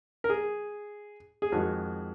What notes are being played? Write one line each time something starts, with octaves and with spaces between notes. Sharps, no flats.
A#4
G#4
G#4
F2 D#3 G#3 F#4